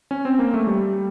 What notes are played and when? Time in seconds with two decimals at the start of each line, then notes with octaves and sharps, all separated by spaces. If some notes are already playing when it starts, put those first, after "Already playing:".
0.11 C#4
0.25 C4
0.39 A#3
0.54 A3
0.67 G3